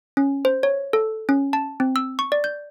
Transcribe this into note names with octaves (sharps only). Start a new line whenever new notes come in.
C#4
C5
C#5
A4
C#4
A5
C4
E6
C#6
D5
G6